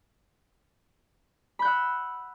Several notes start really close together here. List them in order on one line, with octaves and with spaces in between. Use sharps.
B5 G6 F#5 E6